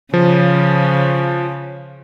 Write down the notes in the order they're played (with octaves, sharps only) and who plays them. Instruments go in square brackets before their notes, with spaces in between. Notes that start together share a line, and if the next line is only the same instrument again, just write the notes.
[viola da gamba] C#3 [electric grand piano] F3